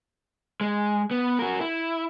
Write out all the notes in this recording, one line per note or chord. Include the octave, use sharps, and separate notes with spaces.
G#3
B3
F#4 A#4
E4